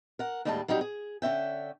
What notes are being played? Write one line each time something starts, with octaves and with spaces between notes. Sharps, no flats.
A#4 F#5
D#2 A2 G3 G#3 B4 A5
F#3 G3 C4 D#4 G4
G#4
D3 C#4 E5 G5